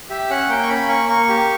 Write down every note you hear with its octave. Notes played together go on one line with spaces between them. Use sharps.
G4 E5
C#4 F#5
A#3 G5
C#6
C#4 B5
A#3 C#6
A#3 C#6
G4